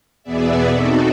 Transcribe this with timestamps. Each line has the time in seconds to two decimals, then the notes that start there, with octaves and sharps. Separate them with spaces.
0.23 E2 B2 B3 G#4 D5 E5
0.71 C4 D#4 F#4 A4